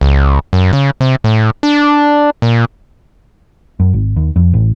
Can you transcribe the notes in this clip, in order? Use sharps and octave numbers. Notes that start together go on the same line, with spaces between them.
C#2
F#2
C#3
C3
A2
D4
A#2
F#2
G#1
D#2
F2
A1